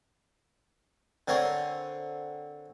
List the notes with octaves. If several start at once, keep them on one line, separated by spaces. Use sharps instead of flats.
D3 C4 A#4 C#5